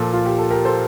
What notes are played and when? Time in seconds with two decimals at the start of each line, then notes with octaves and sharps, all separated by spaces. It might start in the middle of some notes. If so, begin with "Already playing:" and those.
Already playing: A#2 F3 F4 A4
0.13 F4
0.26 G4
0.38 A4
0.50 G4 A#4
0.65 A4 C5